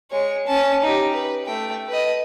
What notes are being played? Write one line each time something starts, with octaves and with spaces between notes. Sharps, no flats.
G#3 C#5
C#4 A5
D#4 G4
B4
A3 G5
B4 D#5